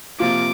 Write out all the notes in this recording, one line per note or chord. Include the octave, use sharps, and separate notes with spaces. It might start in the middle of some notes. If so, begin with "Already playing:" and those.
C3 F3 A#3 F4 D6